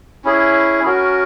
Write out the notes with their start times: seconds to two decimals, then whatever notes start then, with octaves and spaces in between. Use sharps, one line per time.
0.25 C#4 E4 G#4
0.84 C#4 F#4 A#4